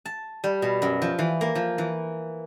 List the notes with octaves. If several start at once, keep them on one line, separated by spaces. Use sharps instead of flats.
A5
G3
B2
F#2
F3
E3
A#3
F3
E3